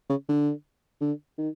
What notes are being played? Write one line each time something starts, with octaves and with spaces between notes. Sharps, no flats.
C#3
D3
D3
D#3